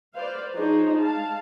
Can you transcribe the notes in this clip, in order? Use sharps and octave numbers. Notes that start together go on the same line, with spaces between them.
B4 C5 D5 F5
F3 D4 D#4 G#4 C5 C#5
G#3 F5 A5